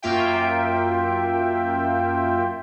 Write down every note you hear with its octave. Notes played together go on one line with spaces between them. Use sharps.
F#2 A#3 F4 E5 G5